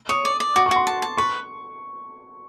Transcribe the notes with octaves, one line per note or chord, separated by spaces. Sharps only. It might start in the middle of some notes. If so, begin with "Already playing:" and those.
C#5 D#6
D5
D5
F#4 D6
C#6
F#4
C6
A5
A5
B4 C#6